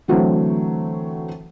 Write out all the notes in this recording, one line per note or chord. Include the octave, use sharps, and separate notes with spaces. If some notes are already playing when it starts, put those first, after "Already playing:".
D3 E3 F#3 A3 C4